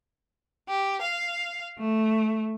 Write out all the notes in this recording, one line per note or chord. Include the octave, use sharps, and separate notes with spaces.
G4
F5
A3